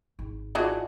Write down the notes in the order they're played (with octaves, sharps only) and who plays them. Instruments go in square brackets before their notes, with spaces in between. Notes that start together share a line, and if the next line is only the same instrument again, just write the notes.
[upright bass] G#1
[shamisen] D#3 E3 G#4 [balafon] F4 A5 D6 [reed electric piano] F#4 D5